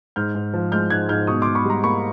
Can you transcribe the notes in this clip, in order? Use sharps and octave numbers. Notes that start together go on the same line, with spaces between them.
G#2 F6 G6
G#2
F3
G#3 F6 G6
G#2 F#6 G#6
G#2 F6 G6
B2 C#6 D#6
B2 C6 D6
B5 C#6
G3 A#5 C6
A#3 B5 C#6